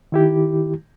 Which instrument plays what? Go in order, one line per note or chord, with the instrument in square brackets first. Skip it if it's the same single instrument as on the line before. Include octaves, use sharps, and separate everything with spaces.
[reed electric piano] D#3 E4 G4